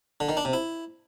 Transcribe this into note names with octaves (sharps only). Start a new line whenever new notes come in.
D3
D#3
D4
C3
E4